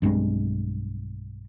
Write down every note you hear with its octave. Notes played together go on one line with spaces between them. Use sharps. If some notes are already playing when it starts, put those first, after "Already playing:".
B1 G2 G#3 C4